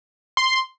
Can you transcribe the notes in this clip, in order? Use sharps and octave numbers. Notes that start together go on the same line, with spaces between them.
C6